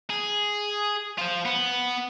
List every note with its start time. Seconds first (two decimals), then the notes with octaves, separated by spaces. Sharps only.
0.10 G#4
1.18 F4 C5
1.45 B3